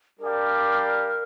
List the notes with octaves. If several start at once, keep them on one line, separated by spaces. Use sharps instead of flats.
G3 D4 G4 A#4 D5 F5